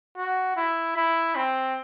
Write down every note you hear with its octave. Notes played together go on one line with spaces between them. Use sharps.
F#4
E4
E4
C4